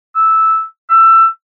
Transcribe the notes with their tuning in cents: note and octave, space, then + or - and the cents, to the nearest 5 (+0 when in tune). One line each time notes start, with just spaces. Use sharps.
E6 -5
E6 +20